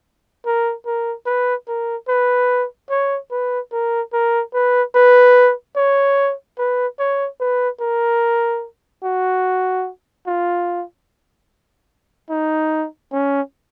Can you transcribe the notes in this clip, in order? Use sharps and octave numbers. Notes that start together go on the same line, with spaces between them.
A#4
A#4
B4
A#4
B4
C#5
B4
A#4
A#4
B4
B4
C#5
B4
C#5
B4
A#4
F#4
F4
D#4
C#4